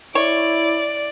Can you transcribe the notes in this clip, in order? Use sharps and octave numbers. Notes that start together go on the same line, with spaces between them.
E4 C#5 D5